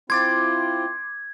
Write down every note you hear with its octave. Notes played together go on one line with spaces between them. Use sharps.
C4 E4 F4 C6 D6 G#6 A6